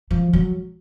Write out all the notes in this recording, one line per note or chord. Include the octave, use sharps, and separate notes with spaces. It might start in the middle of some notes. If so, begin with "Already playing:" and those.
F3
F#3